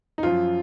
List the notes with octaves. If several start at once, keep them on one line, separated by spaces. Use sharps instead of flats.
D#4
F#2 F3 F4